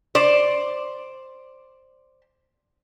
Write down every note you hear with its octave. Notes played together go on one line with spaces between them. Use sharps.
C5 D5